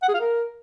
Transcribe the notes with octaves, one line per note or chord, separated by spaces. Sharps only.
F#5
G#4
F5
A#4